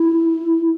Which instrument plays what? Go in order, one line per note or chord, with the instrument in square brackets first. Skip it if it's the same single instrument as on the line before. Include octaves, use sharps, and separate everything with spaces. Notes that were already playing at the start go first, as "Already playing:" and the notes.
Already playing: [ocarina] E4